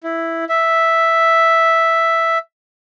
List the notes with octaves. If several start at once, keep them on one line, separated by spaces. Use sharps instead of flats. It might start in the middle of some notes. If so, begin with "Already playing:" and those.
E4
E5